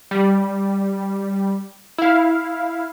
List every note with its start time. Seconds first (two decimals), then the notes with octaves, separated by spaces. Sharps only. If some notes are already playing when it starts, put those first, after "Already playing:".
0.11 G3
1.98 E4 F5